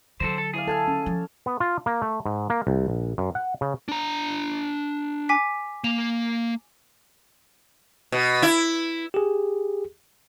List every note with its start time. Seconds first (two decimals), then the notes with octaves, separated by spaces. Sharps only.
0.20 D3 F#3 A4 A#4 C5
0.38 A4
0.54 E4 G#4 D5 F5
0.67 A4 F5 G#5 A5
0.88 C#4
1.06 F3
1.46 B3
1.60 F4
1.86 A#3
2.02 A3
2.25 G#2
2.50 A#3
2.67 C2
2.88 A#1
3.18 F#2
3.35 F#5
3.61 C#3
3.88 D4 A#5
5.29 G#5 D6 B6
5.84 A#3 F7
8.12 B2
8.42 E4
9.14 G4 G#4